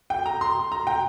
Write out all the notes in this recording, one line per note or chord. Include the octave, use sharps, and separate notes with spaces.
G5
A#5
C6
A#5
G5